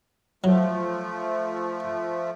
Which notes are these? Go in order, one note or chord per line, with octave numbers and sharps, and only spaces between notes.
F3 F#3 A3